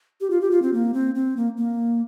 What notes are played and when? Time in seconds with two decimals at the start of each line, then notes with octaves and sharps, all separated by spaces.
0.21 G4
0.30 F4
0.41 G4
0.51 F4
0.62 C4
0.73 A#3
0.94 C4
1.15 C4
1.37 A#3
1.58 A#3